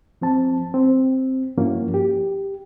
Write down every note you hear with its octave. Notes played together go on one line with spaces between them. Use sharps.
F3 C4 A5
C4
G2 F3 A#3 C#4 E4 F#4
G4